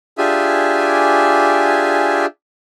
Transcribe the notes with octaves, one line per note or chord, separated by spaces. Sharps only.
D4 F4 G4 G#4 E5 G#5